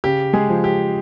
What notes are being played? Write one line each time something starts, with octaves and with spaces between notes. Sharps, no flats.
C#3 G4
G#3 G#4
F3
G4